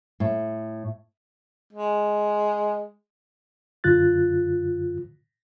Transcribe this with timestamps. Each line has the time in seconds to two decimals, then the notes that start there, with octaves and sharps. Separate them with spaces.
0.20 A2
1.73 G#3
3.84 F#2 D3 F4 F#6 A6